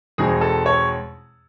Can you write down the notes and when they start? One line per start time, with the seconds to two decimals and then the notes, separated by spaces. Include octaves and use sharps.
0.18 E2 B2 G#3 C4 D#4 G#4
0.41 A4
0.66 C#5